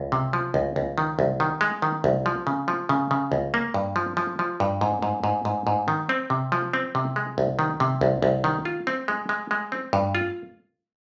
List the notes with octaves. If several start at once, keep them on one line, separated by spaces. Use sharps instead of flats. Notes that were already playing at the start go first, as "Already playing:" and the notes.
Already playing: C#2
C3
F3
C#2
C#2
D#3
C2
D#3
G#3
D#3
C2
F3
C#3
F3
C#3
C#3
C#2
A#3
G2
F3
F3
F3
G2
G#2
G#2
G#2
G#2
G#2
D#3
C4
C3
F3
C4
C3
G#3
C2
D#3
C3
C2
C2
D#3
F4
C4
G#3
G#3
G#3
C4
G2
F4